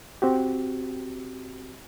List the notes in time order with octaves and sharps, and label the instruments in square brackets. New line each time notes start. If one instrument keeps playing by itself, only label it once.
[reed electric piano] C4 F#4 G4